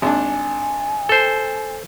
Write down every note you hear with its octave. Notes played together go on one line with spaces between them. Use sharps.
G#1 D4 G#5
A4 C5